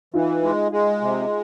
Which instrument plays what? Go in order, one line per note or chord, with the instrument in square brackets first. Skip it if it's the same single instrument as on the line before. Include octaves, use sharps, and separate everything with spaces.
[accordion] E3 [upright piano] D#4 F4
[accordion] G#3
G#3
C3